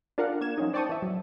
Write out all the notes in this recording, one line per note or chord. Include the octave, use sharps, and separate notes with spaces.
D4 F4 A#4 F5 F#5
A#3 G#6 E7
F3 F#3 C#4 D#4
C5 D5 G5 A5 C#6 D#6
E3 E5
F#3